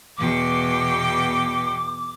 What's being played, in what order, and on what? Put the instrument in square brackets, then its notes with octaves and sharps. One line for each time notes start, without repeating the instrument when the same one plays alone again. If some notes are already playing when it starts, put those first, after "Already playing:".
[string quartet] E2 B2 G5 [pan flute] D6